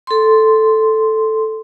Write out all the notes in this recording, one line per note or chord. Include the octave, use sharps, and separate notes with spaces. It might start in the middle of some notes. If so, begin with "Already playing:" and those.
A4 C6